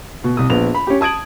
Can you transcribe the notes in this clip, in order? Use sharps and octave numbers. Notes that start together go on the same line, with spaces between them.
B2
C2 D#6
A#1 B3 F7
B5
C#4 G4
A5 D#6 G#6 D7 F#7